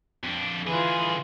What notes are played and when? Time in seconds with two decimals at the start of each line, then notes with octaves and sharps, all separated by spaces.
0.23 F2 D4
0.67 D3 E3 F4 G#4